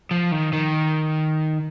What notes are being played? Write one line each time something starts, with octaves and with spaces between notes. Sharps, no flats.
F3
D#3
D#3